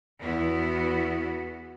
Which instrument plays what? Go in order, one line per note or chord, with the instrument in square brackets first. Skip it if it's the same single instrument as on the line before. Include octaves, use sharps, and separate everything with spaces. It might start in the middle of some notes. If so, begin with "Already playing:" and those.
[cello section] E2 B3 E4 F#4